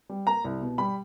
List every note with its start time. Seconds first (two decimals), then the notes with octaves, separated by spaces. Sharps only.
0.09 G3
0.27 A#3 A#5
0.44 C2
0.61 B2
0.78 G3 B5